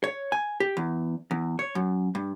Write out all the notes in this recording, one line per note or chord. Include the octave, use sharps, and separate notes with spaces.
C#5
G#5
G4
E2
E2
C#5
F#2
G2